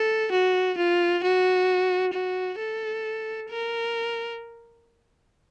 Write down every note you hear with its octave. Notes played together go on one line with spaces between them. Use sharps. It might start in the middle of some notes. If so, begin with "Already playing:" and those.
Already playing: A4
F#4
F4
F#4
F#4
A4
A#4